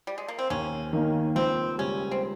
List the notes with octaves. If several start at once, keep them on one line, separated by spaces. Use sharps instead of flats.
G3
G#3
A#3
C4
D#2 C#4
D#3 A#3 D#4
C#2 C4
C#3 G3 C#4
C4